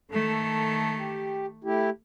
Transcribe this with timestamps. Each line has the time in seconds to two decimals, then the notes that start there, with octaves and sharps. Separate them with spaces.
0.11 D#3 A3 A4
0.98 G4
1.64 A3 E4 G4